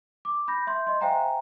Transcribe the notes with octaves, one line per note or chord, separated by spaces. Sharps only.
D6
B5 G6 A#6
E5 C6 G6
D#5 C6
C5 E5 F5 G5 G#5 A#5